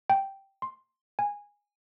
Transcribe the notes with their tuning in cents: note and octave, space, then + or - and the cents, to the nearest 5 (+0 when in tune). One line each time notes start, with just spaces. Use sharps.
G5 -5
C6 +10
G#5 -15